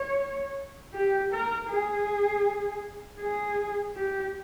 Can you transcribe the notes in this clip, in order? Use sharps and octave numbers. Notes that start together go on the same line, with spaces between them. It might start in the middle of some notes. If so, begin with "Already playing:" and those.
Already playing: C#5
G4
A#4
G#4
G#4
G4